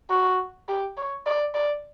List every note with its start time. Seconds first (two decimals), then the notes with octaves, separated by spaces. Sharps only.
0.10 F#4
0.68 G4
0.97 C#5
1.26 D5
1.54 D5